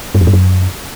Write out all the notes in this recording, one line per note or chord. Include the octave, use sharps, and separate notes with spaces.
G2
F2
G2
F#2